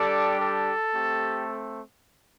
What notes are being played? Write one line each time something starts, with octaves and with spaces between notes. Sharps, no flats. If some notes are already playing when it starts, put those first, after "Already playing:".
Already playing: G3 D4 G4 A4 D5
A4
A3 C4 G4